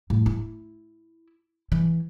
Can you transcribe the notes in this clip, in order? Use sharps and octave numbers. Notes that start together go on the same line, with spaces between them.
A2
E4
E3